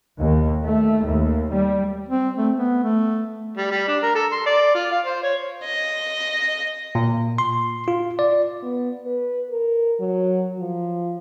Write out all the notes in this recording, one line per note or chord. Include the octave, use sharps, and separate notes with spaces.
D#2
A3
D#2
G3
C4
A3
B3
A3
G3
G3
D4
A#4
A4
C6
D5
F4
F5
C5
C#5
D#5
A#2
C6
F4
D5
B3
B4
A#4
F#3
F3